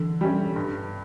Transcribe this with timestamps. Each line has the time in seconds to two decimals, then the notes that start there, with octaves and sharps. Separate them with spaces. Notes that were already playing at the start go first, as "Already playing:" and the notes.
Already playing: D3 E3
0.21 G3 C#4
0.56 G2